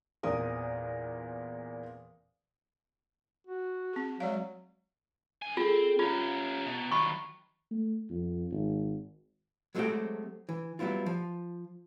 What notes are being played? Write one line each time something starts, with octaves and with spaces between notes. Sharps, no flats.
E2 A#2 C4 A#4 D#6
F#4
C4 G#4
F#3 G#3 D5 F5
D3 G#5
C4 F4 G#4 A4
C#4 F4 G4 A#5
B2
D#3 F#3 B5 C#6
A3
F2
G#1
F#3 G#3 A3 C4 F#4 G4
E3
F#3 G3 B3 E4 F4
F3